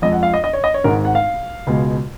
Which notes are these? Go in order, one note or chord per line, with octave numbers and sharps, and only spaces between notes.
F2 F3 G#3 D#5
F#5
F5
D#5
D#5
C#5
D#5
C#5
G#1 G#2 D#3 G#3 A#4
F#5
F5
C#2 B2 G#3